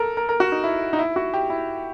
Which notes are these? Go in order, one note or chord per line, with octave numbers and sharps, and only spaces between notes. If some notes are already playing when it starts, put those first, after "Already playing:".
Already playing: A4 A#4
A#4
A#4
F#4
D#4
E4
D#4
E4
F#4
G4
E4